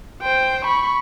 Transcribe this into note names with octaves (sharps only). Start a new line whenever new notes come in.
C5 G5
B5 C#6